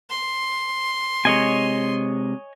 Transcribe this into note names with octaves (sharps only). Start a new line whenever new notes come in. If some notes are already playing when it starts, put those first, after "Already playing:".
C6
C3 G#3 C#5 D#5 G#5